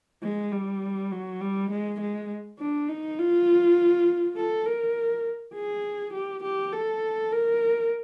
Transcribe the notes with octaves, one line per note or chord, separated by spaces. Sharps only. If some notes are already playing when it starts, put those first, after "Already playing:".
G#3
G3
F#3
G3
G#3
G#3
D4
D#4
F4
A4
A#4
G#4
G4
G4
A4
A#4